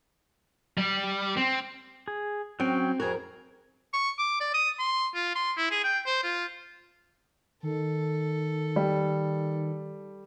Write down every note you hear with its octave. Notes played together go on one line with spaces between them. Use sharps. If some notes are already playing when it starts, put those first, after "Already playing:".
G3
C4
G#4
F#3 C4 C#4 G5
F2 F#4 G#4 A#4
C#6
D6
D5
D#6
C6
F4
C6
E4
G#4
G5
C5
F4
D#3 A4
G3